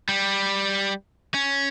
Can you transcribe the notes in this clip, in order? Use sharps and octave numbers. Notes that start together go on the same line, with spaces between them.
G3
C#4